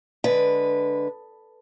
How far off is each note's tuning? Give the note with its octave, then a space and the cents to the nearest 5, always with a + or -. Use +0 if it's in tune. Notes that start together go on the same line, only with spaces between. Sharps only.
D3 +0 G#3 +5 B4 +0